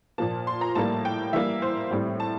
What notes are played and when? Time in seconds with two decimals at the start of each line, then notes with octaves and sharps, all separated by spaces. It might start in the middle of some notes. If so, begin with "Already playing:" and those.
0.18 A#2 F3 A#3 A5
0.47 C6
0.61 A#5
0.75 A2 G3 A#3 A5
1.05 G5
1.33 E3 G3 A#3 E5
1.62 C5
1.91 A2 G3 C4
2.20 A5